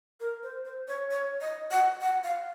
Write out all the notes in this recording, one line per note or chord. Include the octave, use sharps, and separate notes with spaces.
A#4
C5
C5
C#5
C#5
D#5
F#5
F#5
F5